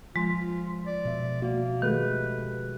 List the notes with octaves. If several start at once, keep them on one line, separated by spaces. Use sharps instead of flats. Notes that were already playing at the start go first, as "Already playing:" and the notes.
F3 G#3 F4
D5
B2 E5
A#3 F#4
D#3 G#3 A3 G4 B4